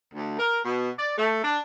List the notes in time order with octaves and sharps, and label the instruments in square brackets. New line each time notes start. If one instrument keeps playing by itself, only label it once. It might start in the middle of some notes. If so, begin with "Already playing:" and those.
[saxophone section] D2
A#4
B2
D5
A3
D4